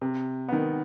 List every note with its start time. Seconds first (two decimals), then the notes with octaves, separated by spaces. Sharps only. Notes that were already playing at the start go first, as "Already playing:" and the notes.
0.01 C3
0.49 D#3 B3